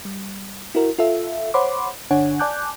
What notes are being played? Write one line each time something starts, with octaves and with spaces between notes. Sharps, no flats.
G3
E4 F#4 A#4
F4 A4 E5
C5 C#5 F#5 B5 C6 D6
G1 D3 D4 C#5 F#5 G#5
D5 G#5 A5 D6 F#6 G6